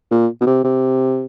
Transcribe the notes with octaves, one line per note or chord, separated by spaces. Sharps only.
A#2
B2
C3
C3